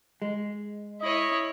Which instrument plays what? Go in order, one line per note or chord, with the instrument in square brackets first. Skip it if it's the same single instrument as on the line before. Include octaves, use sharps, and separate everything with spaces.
[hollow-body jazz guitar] G#3
[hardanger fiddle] E4 C#5 [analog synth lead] D#5